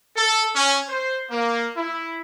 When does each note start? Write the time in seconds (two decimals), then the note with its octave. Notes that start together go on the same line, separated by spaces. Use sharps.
0.16 A4
0.55 C#4
0.88 C5
1.30 A#3
1.76 E4